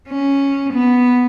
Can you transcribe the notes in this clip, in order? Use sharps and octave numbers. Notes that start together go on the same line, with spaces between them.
C#4
B3